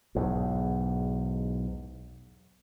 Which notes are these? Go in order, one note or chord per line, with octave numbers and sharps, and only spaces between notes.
B1 E2 G#2